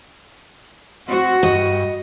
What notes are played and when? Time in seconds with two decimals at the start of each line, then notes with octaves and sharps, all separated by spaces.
1.08 C4 F#4
1.43 G2 D#5